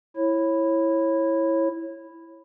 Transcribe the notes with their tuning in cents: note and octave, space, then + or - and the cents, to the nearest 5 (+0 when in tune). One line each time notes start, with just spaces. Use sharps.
E4 +0 C#5 -25